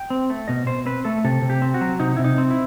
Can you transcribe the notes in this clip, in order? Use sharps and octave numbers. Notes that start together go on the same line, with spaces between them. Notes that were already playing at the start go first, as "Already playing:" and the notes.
Already playing: G5
C4
A3
B2 D#5
B2 C5
C4 B4
A3 A4
C3 A4
C3
G4
C4
F#4
F#3
C3 D#4
C3 E4
D#4
C4
E4